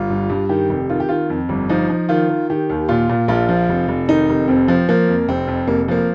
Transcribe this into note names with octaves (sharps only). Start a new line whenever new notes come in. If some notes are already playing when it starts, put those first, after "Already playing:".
Already playing: G1 F4
G2
G2
D#3 G4
F1
D#3 F4
G4
D#3 F4
F2
G1
F3 D#4
F3
D#3 F4
D#3
D#3 G4
D#2
A#2 F4
A#2
A#1 F4
F3
F1
F1
D#3 D#4
F1
F2 C4
F3
F3 A#3
F2
F1 C4
F2
F1 A#3
F3 A#3